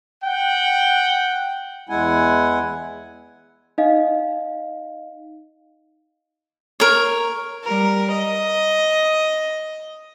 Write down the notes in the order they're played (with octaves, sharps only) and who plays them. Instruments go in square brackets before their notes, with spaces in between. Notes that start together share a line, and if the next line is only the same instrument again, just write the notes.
[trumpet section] F#5 G5
[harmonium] E2 G#3 E4 F#5 G#5
[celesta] D#4 D#5 F5
[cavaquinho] A#4 C#5
[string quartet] G3 A#4
D#5